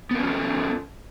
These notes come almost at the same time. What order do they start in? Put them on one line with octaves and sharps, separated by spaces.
B3 A#4 C#4 F4 A4